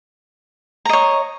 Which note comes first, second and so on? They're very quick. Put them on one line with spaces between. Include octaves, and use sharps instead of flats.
A#5 D#5 C#5